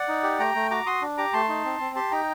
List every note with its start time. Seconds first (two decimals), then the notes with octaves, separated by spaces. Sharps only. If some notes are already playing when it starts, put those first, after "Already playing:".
Already playing: D5 F#5
0.08 D#4
0.23 G4
0.39 A3 G5 A#5
0.55 A3
0.71 F#4 A#5 D6
0.86 F#4 C6 D#6
1.02 D4
1.18 G4 A#5 D6
1.33 A3 A5 C6
1.49 D#4
1.65 C4
1.80 C4
1.95 G4 A5 C6
2.11 D#4 G5 A#5